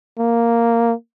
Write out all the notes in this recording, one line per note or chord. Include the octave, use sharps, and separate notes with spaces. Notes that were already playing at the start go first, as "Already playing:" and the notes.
A#3